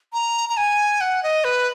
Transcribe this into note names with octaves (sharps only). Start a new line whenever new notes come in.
A#5
A#5
G#5
F#5
D#5
B4